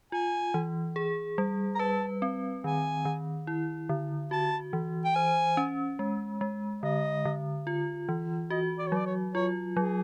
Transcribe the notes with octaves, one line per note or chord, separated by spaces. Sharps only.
F4 G#5
E3
G#4
G3
A#5
B4 A5
C4
D#3 G#5
D#3
E4
D3
F#4 A5
E3
G5
C5 G#5
C#4
G#3
G#3
D3 D#5
D3
F4
E3
F#4 D#5
D5
C#5
F#3 D5
C#5
F4 C#5
F#3 G#4